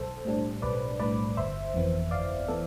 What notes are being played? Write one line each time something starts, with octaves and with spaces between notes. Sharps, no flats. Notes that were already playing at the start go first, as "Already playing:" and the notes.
Already playing: B1 A4 C5
A2 G3 D4
B1 B4 D5
A2 G3 D4 B4 D5
G1 C5 E5
F2 E3 B3
G1 D5 F5
E3 B3 A4